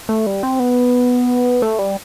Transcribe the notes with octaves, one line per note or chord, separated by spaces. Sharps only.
A3
G3
C4
B3
A3
G3